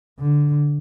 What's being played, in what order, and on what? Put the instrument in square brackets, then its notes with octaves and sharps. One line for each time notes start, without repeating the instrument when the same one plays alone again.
[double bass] D3